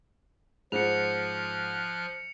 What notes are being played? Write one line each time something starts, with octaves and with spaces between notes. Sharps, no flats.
G#2 F3 F4 C5 F6 F#6 C#7 F7